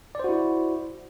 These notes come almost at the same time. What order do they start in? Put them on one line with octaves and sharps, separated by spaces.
D5 C5 F#4 E4